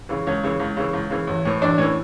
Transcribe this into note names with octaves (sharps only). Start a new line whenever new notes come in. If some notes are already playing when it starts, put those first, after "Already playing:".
C#3 E3
C#2 C#4 C#5
C#3 E3
C#2
C#3 E3
C#2
C#3 E3
A1
A2 E3
A1 D4 D5
A2 E3 C#4 C#5